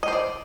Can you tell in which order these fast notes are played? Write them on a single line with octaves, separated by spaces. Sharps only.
D#5 C5 D5